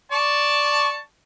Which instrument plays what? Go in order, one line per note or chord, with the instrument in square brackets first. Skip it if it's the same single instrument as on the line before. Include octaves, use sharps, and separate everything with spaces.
[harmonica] D5 A5 C#6